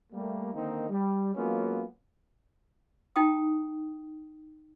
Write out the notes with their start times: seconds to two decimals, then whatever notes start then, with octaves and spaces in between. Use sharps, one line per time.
0.13 G3 A3 A#3
0.54 D3 D#3 A#3 C4 D#4
0.90 G3
1.35 F#3 G#3 A#3 B3 C#4 F4
3.16 D#4 E4 G5 A5 D#6